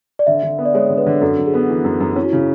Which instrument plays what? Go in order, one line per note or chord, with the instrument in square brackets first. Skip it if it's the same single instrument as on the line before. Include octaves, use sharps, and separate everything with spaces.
[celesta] D5
[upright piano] D3 [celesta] E5
[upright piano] D3
B3
[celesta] D5
[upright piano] G#3 [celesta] C#5
[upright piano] D3
[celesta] B4
[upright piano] D3
[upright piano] F#2 [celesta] A4
[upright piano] F#2
[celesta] G#4
[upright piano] B3
E3
F#2
F#2
[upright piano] C#4 [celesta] E4
[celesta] F#4
[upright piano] C#3 [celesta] E4